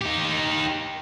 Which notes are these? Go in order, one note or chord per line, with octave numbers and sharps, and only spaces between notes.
D#4 G4